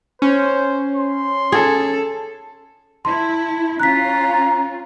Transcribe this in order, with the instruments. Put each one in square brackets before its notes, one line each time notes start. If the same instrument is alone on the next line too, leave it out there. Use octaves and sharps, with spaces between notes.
[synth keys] C#4 [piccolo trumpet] C5
[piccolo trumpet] C6
[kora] G#4 [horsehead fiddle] A4
[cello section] E4 [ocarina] A5 [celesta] C6
[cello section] C#4 F4 [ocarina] A#5 [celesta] F#6 B6